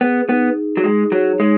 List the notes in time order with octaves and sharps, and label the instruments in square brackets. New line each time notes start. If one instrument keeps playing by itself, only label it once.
[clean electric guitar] B3 [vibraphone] G#4
[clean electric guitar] B3 [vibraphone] D#4
[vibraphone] G#4
[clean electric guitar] F#3
[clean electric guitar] G#3 [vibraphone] G#4
[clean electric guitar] F#3 [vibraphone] C#5
[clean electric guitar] G#3 [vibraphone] D#4